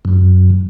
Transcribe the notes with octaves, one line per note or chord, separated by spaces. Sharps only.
F#2